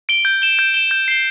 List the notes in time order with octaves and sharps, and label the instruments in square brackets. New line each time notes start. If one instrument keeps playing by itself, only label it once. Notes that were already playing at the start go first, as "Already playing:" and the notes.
[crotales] D7 G7
G6
E7 G7
G6
E7 G7
G6
C7 G7